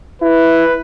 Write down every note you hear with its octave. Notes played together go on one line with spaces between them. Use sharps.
E4 B4